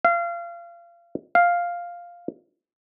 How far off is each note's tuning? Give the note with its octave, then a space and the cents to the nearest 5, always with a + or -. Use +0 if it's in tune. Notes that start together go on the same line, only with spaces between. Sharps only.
F5 -30
F5 +0